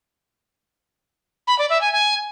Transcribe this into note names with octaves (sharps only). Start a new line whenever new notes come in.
B5
D5
E5
G#5
G#5